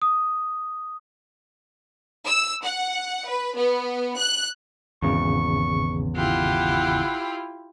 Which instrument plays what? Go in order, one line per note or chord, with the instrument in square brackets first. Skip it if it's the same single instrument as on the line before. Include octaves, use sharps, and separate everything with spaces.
[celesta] D#6
[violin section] E6
F#5
B4
B3
F#6
[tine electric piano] G#1 C#3 [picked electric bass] E2 [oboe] C#6
[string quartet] E4 F4 G4 [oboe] F#5